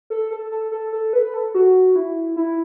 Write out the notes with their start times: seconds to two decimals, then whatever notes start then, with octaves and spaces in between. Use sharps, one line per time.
0.10 A4
0.31 A4
0.51 A4
0.71 A4
0.92 A4
1.13 B4
1.34 A4
1.55 F#4
1.96 E4
2.36 E4